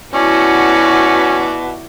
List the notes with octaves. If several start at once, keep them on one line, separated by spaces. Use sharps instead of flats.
B2 C#4 E4 F#4 D5